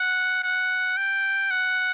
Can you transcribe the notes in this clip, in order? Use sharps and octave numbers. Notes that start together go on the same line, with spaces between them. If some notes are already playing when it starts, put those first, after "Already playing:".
Already playing: F#5
F#5
G5
F#5